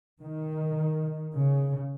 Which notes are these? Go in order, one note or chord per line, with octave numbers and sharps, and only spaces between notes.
D#3
C#3